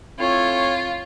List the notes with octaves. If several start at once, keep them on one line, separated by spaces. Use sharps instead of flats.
A2 C4 F4 C#5